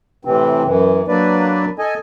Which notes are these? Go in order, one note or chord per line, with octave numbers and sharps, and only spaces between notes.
A2 C3 E3 C4
F#2 E3
F#3 A#3 D4 B4 D5
A4 D#5 G#5